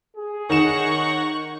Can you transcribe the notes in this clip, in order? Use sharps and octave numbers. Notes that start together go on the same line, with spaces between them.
G#4
D#3 C#5 F#5 A#5 C#6 E7